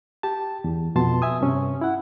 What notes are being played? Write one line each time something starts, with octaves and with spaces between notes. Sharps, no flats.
G4 A5
E2
F2 B2 A5 C6
E5 G#5 D#6
G2 C3 C#4
E4 F#5